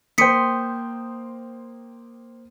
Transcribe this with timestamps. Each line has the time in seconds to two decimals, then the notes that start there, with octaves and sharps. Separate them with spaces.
0.18 A#3 C5 G5 C6 D#6 B6 C#7